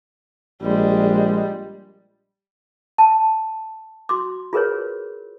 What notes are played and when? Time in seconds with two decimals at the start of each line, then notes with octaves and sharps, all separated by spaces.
0.62 A#1 G3 G#3
2.98 A5
4.09 F#4 C6 D6
4.53 F4 G#4 A#4 B4 C#5